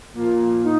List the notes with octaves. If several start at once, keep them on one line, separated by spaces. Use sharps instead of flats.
A#2 F3 A#3 F4
D#4